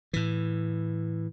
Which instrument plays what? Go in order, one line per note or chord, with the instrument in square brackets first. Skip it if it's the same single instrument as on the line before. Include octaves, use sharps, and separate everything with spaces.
[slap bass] A2 E3